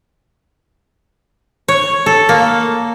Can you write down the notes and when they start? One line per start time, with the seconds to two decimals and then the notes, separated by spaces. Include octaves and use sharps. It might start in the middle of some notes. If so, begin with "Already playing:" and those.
1.68 C#5
2.06 A4
2.29 A#3